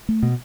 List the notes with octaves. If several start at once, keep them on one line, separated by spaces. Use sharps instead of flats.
A3
B2